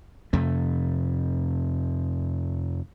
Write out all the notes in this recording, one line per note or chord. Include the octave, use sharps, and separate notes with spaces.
F2 C3 A3